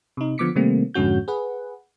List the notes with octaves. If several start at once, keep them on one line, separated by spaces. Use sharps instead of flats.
C3 D#4
D3 F3 B3 D6 B6 C#7
C3 D#3 G3 A3 A#3 C4
F2 G#2 D3 C#4 F#4 G6
G#4 B4 F#5